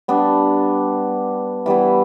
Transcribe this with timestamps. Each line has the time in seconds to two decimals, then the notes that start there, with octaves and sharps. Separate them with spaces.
0.08 G3 B3 D4
1.66 E3 G3 B3 E4